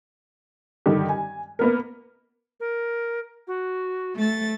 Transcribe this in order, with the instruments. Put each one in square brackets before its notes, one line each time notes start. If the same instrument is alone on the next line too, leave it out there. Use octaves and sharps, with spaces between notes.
[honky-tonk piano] G2 D3 D#3 G4
G#5
A#3 B3 A#4
[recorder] A#4
F#4
[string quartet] A3 A6